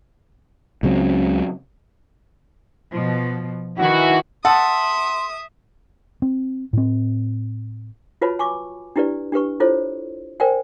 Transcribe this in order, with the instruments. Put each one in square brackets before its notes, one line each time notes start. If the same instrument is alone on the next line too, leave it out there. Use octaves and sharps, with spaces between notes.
[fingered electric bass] C#2 C#3 F#3 C4
[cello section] B2 F3
[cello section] D#3 E4 [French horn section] E3 F#4
[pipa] A4 [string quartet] E5 D#6 [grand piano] F#5 [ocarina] C6
[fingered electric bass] C4
A2 C4
[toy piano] F4 F#4 B4 C#5 A5 B5
G#5 C#6 D6
D4 E4 G4 B4 D5
D4 G4 B4 C#6
E4 F4 A4 C5 C#5
A#4 C5 D5 G5 G#5